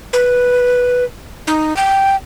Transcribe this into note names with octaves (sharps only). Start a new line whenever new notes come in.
B4
D#4
G5